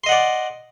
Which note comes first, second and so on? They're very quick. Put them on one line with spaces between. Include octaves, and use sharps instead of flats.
C6 D#5 F#5 D5